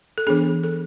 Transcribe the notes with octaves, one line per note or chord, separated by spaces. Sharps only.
A4
E3 B3 D4 G#4
A4